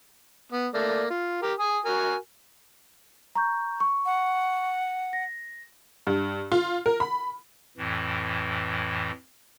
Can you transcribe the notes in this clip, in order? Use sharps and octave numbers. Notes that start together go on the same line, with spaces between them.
B3
A3 A#3 D5
F4
G4 A#4
G#5 D#6
F#4 A#4 G#5
A#5 C#6 G6
C#6
F#5
A#6
G2
F4
A#4
B5
F2 A2 E3